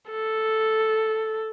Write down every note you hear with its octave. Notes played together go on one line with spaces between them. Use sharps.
A4